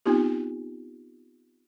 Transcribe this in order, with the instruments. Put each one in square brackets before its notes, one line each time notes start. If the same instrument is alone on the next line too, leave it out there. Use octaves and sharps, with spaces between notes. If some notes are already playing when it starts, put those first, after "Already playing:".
[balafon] B3 C4 D#4 F4 G4